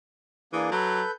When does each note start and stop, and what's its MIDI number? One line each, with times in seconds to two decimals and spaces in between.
0.53 0.69 52
0.53 0.69 58
0.53 0.69 62
0.53 0.69 68
0.72 1.02 54
0.72 1.11 69
0.72 1.11 71
0.72 1.11 91